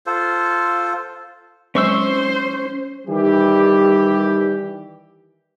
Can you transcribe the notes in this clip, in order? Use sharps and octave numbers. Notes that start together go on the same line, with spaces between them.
F4 A4 C5
F#3 G#3 C4 C#4 C5 C#6 E6
D#3 E3 G3 G4